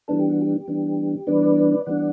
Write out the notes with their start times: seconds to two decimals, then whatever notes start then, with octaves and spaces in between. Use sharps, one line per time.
0.08 E3 G3 B3 D4 A4
0.19 G4
0.30 F#4
0.41 G4
0.68 E3 G3 B3 D4
1.27 E3 G3 B3 D4 B4 D5
1.86 E3 G3 B3 D4 D5 F#5